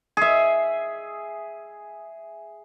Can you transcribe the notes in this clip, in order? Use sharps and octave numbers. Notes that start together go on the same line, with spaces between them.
G#4 E5